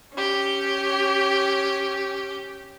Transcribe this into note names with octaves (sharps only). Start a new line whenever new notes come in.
C#4 G4